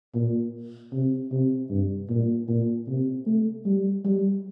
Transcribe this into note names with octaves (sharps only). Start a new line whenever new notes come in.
A#2
C3
C3
G2
A#2
A#2
C3
A3
G3
G3